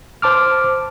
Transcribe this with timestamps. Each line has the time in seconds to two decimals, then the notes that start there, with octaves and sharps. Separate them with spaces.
0.22 C5 A5 D6 F6